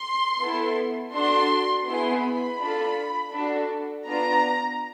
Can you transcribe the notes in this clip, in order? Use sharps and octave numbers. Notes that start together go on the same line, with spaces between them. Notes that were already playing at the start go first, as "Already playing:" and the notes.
Already playing: C6
B3 E4 A4
D4 F#4 A4 C6
B3 E4 G#4 C6
B5
D4 F4 A4
D4 F#4 A4
B3 D4 F4 A#5